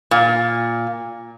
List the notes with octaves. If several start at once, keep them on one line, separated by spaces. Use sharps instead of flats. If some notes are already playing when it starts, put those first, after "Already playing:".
A#2